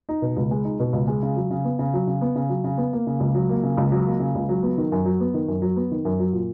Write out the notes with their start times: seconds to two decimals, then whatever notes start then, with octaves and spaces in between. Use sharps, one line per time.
0.09 D#4
0.22 B2
0.37 C#2
0.51 G#3
0.64 D#4
0.80 B2
0.93 C#2
1.08 G#3
1.23 C#3
1.36 F#3
1.51 C#3
1.65 B3
1.79 C#3
1.94 F#3
2.07 C#3
2.21 B3
2.35 C#3
2.49 F#3
2.64 C#3
2.78 B3
2.93 A#3
3.07 C#3
3.20 C#2
3.35 F#3
3.49 A#3
3.63 C#3
3.77 C#2
3.92 F#3
4.06 A#3
4.20 C#3
4.35 C#2
4.49 F#3
4.63 B3
4.78 D#3
4.92 F#2
5.06 F#3
5.20 B3
5.34 D#3
5.48 F#2
5.62 F#3
5.76 B3
5.91 D#3
6.05 F#2
6.20 F#3
6.33 A#2